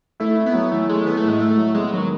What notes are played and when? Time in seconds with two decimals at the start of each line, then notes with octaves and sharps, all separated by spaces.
0.20 A3 E4
0.37 E4
0.46 B3
0.54 F#3
0.72 E3 A3
0.88 G#3 A3
1.05 E3 B3
1.17 A3
1.23 A2
1.28 G#3
1.40 A2 A3
1.57 F#3
1.74 G#3 B3
1.92 D#3 F#3